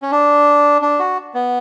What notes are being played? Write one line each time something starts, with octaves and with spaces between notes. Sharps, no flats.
C#4
D4
D4
F#4
B3